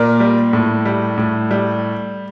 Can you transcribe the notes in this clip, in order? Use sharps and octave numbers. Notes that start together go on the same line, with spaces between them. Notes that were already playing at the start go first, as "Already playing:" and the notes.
Already playing: A#2 A#4 D5
G3
A2
G3
A2
G3